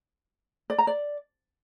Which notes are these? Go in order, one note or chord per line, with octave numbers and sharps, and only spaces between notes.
D5
A#5
D5